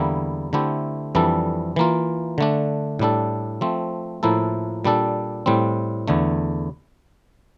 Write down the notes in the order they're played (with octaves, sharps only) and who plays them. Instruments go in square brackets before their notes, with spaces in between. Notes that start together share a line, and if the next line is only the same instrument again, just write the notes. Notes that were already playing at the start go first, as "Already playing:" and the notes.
Already playing: [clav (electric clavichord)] E2 D3 G3 A#3 E4
D3 A3 C4 E4 G4
F2 E3 G3 D4 A4
E3 A#3 F4
D3 A3 D4
A2 G3 D4 A4
F3 A3 C4
A2 F3 A#3 E4 A4
A#2 G3 D4 A4
A2 G3 C4
E2 D3 A3